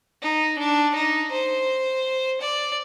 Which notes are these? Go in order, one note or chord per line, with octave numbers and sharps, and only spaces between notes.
D#4
D4
D#4
C5
D5